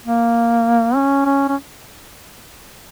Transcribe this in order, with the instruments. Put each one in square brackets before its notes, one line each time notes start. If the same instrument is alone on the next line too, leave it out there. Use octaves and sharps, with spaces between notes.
[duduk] A#3
C#4
C#4
C#4